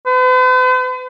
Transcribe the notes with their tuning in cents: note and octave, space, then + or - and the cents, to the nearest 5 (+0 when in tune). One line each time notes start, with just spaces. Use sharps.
B4 +45